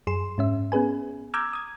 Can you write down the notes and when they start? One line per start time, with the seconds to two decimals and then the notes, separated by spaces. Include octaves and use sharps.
0.07 F#2 G#4 C6 E7
0.38 G#2 C#4 E5
0.72 B3 C#4 G#4 B4 G#5
1.34 A#5 D6 E6 F6 G6 G#6
1.53 D#6 G#6